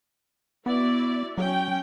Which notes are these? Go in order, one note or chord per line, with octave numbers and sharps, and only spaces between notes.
B3 E4 F#4 D5
F#3 C#4 G5